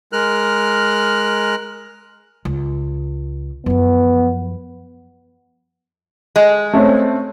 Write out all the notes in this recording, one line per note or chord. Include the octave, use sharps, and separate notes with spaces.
G#3 A#4 F6 F#6
C#2
F#2 F3 B3
G#3
A3 C4 C#4